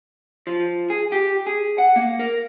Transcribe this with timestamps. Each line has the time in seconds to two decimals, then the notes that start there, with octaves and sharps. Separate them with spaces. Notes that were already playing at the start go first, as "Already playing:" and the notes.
0.47 F3
0.90 G#4
1.12 G4
1.47 G#4
1.78 F#5
1.96 A#3
2.19 A#4